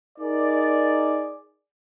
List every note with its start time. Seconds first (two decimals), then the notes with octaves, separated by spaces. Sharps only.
0.18 D#4 G#4 A#4 D5